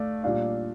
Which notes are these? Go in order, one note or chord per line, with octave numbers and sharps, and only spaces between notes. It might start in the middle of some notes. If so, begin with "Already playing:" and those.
Already playing: A3 D5 F5
A#2 G3 D4 D5 F5